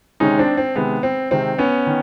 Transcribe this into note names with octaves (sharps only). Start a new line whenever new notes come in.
C3 D#3 G#3 C#4 D#4
C4 D4
C4
C3 D#3 G#3 B3
C4
C3 D#3 G#3 C4
B3 C#4
D#3